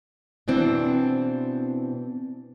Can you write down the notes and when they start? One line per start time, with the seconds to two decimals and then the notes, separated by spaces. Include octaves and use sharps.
0.48 B2 E3 C4 D4